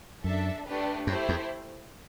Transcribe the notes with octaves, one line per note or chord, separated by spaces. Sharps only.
F#2 D4 A4 E5
A3 D4 G4 B4
F#2 A3 E4 G4 C5
E2